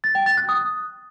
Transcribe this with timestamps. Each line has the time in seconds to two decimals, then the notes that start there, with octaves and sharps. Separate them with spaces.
0.04 A6
0.15 G5
0.26 A6
0.37 F#6
0.49 D#6